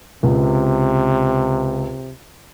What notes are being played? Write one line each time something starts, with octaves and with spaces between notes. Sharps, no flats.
C#2 C3